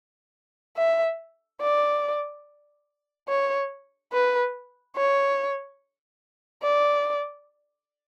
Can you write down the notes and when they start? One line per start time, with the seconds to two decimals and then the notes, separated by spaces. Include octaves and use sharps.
0.77 E5
1.61 D5
3.29 C#5
4.13 B4
4.97 C#5
6.63 D5